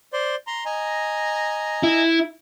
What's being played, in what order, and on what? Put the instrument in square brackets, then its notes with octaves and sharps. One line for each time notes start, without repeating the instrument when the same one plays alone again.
[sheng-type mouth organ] C5 D5 C6
A#5 C6
D#5 G#5 A#5
[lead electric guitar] E4